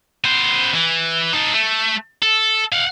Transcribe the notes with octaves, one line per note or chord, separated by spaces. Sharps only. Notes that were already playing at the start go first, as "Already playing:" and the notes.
B3 C5
E3
D#4 A4
A3
A4
F5 F#5